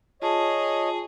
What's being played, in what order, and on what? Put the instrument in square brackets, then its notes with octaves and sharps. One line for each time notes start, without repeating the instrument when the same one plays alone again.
[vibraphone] F4 A5 [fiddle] G#4 [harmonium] C#5 D#5